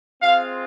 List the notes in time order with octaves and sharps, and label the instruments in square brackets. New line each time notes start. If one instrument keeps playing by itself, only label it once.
[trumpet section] G#3 C4 F4 F5